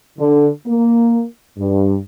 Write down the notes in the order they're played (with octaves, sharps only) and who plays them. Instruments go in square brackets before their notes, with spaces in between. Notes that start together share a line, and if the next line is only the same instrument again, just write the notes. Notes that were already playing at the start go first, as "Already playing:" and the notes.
[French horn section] D3
A#3
G2